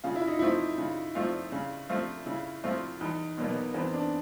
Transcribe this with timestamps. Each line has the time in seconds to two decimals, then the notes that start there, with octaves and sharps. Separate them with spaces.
0.04 C#3 F4
0.16 E4
0.27 D#4
0.39 F3 A3 C4 E4 F4
0.77 C#3
1.15 F3 A3 C4 F4
1.52 C#3
1.89 F3 A3 C4 F4
2.26 C#3 E4
2.64 F3 A3 C4 F4
3.00 E2 D#4
3.38 B2 F#3 A#3
3.49 B3
3.74 E2 C4
3.94 D4